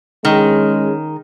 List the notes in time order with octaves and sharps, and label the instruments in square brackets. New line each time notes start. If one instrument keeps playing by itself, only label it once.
[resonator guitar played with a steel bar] D#3 [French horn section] G#3 C#4 G#4